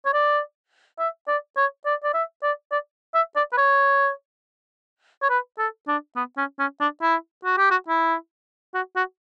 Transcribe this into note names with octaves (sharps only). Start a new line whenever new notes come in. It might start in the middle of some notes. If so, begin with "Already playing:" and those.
C#5
D5
E5
D5
C#5
D5
D5
E5
D5
D5
E5
D5
B4
C#5
C#5
B4
A4
D4
B3
C#4
C#4
D4
E4
F#4
G4
F#4
E4
F#4
F#4